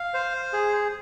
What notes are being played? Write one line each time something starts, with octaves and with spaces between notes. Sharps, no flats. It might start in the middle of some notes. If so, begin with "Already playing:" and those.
Already playing: F5
C5
G#4